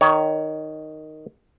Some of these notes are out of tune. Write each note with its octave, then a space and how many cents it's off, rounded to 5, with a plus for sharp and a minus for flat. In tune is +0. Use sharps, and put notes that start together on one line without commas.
D#3 -5 C#5 +20